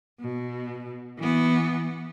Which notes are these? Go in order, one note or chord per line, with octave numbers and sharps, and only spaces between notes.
B2
E3 B3